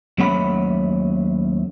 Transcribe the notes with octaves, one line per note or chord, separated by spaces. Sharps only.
D#2 F#3 A3 C#4 F#5 B5